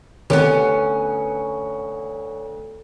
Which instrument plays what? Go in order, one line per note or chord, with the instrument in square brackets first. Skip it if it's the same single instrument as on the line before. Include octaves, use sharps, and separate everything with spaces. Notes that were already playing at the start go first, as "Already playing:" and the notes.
[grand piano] D2 [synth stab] C3 D#3 G4 [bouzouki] B3 C#4